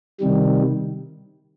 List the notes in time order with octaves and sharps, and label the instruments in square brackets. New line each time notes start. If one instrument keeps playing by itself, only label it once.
[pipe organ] C3 D#3 G3